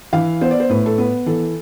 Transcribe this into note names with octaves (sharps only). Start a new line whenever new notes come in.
E3 F5
B3 C5
D5
C5
A2 B4
A4
B3 B4
E3 A4